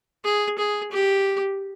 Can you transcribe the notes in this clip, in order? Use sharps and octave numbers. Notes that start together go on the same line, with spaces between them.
G#4
G#4
G4